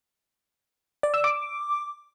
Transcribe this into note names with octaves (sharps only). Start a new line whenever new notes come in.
D5
E6
D6